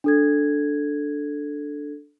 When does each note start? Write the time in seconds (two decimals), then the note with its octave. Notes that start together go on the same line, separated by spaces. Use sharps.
0.04 D4 A4 G#6